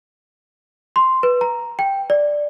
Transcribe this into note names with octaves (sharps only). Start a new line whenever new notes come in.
C6
B4
A#5
G5
D5